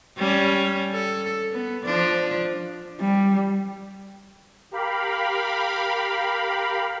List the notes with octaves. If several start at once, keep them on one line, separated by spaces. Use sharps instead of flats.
G3 C#4
A4
B3
F3 D4
G3
G4 A#4 F5 B5